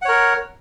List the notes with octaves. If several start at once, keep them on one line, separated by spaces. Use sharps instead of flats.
A#4 C#5 F#5